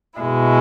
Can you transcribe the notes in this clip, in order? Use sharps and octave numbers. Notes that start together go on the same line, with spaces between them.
B2 G#3 E4